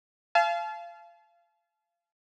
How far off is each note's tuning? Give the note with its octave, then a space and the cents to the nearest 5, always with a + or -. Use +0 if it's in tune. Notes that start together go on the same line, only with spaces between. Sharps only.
F5 -25 A5 -40